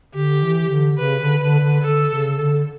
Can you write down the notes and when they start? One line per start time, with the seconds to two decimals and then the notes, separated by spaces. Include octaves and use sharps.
0.14 D3 G4
0.42 E3
0.70 D3
0.98 C#3 B4
1.20 D3
1.40 D3 B4
1.61 D3
1.82 D3 A4
2.10 C#3
2.37 D3